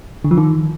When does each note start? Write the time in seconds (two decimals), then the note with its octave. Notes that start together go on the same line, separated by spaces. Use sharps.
0.25 D3
0.31 F3
0.38 D#3